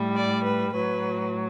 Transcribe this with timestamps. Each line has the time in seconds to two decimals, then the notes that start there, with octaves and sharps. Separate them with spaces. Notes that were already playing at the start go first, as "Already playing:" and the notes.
Already playing: A2 G3
0.16 D5
0.44 B4
0.73 A2 F#3 B4